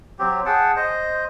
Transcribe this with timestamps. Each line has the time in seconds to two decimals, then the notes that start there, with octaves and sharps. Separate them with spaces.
0.19 F#3 C4 G4
0.46 G#4 F#5 G5 A5
0.76 C5 D#5